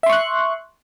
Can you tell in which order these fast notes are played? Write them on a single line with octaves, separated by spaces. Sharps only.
E5 C6 C#6 F#6